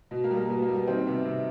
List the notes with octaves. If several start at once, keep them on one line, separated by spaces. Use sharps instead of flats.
B2
A#3
G3
A#3
B2 B3
A#3
G3
B3
D#3 C4
C3 B3
C3